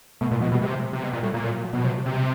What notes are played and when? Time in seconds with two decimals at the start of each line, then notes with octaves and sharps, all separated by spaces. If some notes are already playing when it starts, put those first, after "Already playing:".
0.21 B2 A3
0.31 A#2
0.40 B2 F3
0.48 F#3
0.52 B2
0.54 G3
0.62 C3 G#3
0.93 C3
1.03 B2 G#3
1.13 A#2
1.23 A2 G3
1.34 A#2
1.44 F#3
1.65 F#3
1.73 B2
1.84 C3 F#3
1.98 G3
2.06 C3
2.13 G3